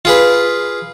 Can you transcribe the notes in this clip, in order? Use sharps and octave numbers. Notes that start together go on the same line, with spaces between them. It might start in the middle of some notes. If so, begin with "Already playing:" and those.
F4 G#4 B4